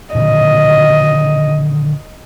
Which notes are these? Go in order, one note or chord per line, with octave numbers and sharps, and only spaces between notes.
A#2 D3 D#3 D#5